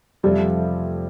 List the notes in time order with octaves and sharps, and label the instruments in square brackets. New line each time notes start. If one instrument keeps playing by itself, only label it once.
[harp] F1 F2 F3 A3 C4 [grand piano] G3